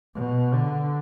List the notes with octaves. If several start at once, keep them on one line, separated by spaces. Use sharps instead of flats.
B2
D3